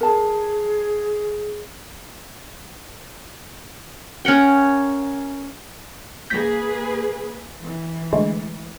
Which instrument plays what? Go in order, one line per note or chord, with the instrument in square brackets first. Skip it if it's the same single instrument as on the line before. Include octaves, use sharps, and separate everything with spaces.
[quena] G#4 [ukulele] A#4 A5
[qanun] C#4 A#4 F#5 G5
[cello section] A#3 G#4 B4 [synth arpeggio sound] G6 A#6 B6
[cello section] E3
[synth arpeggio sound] D3 G#3 A3